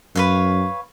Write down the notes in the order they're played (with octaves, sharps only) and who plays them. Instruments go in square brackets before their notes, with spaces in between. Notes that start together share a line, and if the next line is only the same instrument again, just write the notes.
[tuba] F#2 [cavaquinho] B4 C#5 F5